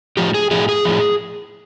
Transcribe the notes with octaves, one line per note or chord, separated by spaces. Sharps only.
A2 F3 G4
G#4
A2 F3 G#4
G#4
A2 F3